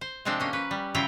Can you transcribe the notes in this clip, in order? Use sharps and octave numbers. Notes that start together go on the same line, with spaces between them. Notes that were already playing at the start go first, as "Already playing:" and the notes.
C5
C3 F3 G#3 C4 D4 C5
A#3 C#4 C5
C#4 B4
G3
C#3 F#3 E4 F4 G5 A#5